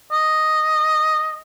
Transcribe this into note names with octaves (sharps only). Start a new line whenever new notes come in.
D#5